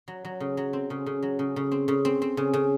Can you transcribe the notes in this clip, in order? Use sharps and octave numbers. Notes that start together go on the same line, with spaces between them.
F#3
F#3
C#3
F#3
C4
C#3
C#3
F#3
C#3
C#3
C4
C#3
C4
C4
C#3
C#3